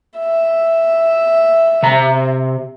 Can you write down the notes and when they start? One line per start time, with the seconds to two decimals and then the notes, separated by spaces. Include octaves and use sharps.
0.18 E5
1.83 C3 A#5